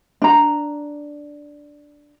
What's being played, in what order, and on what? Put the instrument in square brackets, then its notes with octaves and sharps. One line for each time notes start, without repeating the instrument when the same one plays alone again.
[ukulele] D4 A#5